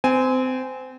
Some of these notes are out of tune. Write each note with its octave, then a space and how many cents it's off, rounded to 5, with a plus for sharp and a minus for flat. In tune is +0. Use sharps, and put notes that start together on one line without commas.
C4 -25 G#5 +0